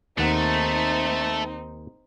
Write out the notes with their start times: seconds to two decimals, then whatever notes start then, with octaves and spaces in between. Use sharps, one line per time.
0.18 D#2 A3 C4 D#4 F#5